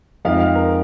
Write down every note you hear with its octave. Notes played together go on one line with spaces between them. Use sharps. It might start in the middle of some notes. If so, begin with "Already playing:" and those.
F2 F3 G#3 D#4 F5
F5
A#4